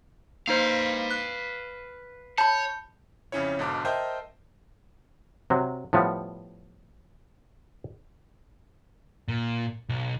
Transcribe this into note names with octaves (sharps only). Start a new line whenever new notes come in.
A#3 D#4 B4 C5 F5
F#6
C#5 A5 B5 G6
F2 C#3 C#4 E4 C#5
B1 G#2 B2 D3 A5 D6
A#4 C5 D#5 E5 G5 A5
C3 F#3
A2 F3 G3 B3
A#2
B1